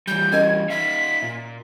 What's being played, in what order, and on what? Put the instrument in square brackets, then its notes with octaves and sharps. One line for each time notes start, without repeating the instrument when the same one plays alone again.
[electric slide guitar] E3 G3 [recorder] G6
[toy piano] C#4 A#4 D#5 [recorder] G#6
[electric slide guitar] D#4 E5 F5 [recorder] B6
[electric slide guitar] A#2